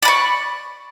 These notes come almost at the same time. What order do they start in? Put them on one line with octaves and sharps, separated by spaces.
D5 B5 C#6